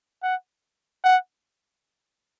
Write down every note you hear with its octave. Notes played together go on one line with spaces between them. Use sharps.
F#5
F#5